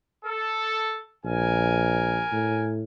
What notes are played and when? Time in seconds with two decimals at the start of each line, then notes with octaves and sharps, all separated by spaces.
0.24 A4
1.25 A#1 A#4 G#5
2.32 A2